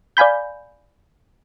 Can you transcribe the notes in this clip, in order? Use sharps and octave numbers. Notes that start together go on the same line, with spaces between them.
D5 F5 G#5 B5 G6